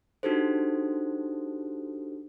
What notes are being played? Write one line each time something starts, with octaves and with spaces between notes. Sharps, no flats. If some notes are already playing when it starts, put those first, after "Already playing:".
D4 D#4 F#4 G4 A4 C5